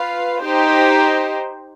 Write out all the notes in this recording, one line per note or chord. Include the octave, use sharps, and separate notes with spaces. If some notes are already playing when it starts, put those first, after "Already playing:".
Already playing: F4 B4 F5
D#4 G4 C5